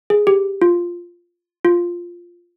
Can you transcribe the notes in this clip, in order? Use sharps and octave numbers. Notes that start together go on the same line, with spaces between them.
G#4
G4
F4
F4